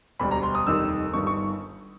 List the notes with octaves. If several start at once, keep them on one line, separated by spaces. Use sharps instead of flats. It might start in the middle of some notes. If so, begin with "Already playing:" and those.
E1 D2 D3 G3 B5
A#5
C6
D#6
F1 D#2 D#3 G3 E6
G1 G2 D#3 C#6
C#6